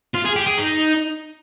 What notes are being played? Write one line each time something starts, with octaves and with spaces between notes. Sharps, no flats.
F4
G#4
G4
G#4
D#4